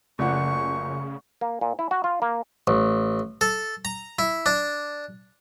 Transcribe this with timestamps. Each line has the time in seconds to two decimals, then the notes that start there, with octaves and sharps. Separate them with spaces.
0.19 F#1 C#3 F3 A3 D5 F#5 C#6
1.41 A#3
1.61 A#2
1.79 E4
1.91 F#4
2.04 F4
2.22 A#3
2.67 A1
3.41 A4
3.85 A#5
4.19 E4
4.46 D4